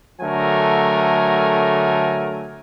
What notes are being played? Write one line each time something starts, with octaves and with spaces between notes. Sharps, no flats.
D3 F#3 A3 A#4 G#5